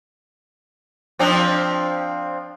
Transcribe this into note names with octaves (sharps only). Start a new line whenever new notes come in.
F3 C4 D4